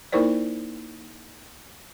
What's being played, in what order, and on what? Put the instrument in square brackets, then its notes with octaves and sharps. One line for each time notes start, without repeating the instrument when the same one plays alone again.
[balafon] A#3 D#4 E4 A#4 C5 D5